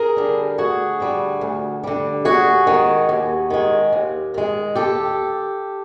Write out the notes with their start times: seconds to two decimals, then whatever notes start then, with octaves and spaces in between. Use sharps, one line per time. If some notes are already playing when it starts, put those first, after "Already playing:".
Already playing: G#4 A#4
0.17 D3 G3
0.58 D2 F#4 G#4
1.00 D3 G3
1.41 D2
1.83 D3 G3
2.25 D#2 F#4 G#4
2.67 D#3 G#3
3.09 D#2
3.50 D#3 G#3
3.93 D#2
4.34 D#3 G#3
4.75 D#2 G4 A4